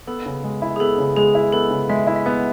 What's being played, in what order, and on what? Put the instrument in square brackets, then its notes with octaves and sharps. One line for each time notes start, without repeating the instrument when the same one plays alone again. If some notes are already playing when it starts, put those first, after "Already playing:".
[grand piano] B3 [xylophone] A4
[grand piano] C#3
G#3
E4
[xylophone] G#4
[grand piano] B3 [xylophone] A4
[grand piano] C#3
[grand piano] G#3 [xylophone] G#4
[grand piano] E4
[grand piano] B3 [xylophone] A4
[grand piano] C#3
[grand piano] G#3 [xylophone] E5
[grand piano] E4
[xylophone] E5
[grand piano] B3 [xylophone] F#5